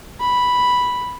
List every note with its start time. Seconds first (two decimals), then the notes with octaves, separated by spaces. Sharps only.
0.20 B5